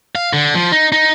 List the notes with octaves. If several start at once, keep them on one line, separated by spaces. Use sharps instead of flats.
F5
D3
F3
D#4
D#4